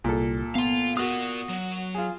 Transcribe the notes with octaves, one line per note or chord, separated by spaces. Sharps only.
C2 A#2 A4
B3 F5 C6
F4 F#4 A#4 D#6
F#3
F4 G#4